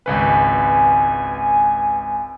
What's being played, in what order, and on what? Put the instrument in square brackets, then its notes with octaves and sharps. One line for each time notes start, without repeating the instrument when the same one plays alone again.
[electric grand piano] G#1 C#2 B4 [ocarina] G#5